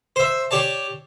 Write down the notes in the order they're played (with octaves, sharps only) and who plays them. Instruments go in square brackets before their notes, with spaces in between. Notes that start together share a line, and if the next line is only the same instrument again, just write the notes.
[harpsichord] C5 E5
G4 C#5 D5 A5